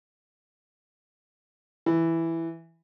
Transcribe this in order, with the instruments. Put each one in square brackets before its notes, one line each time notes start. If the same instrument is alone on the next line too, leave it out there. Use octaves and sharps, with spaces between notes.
[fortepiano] E3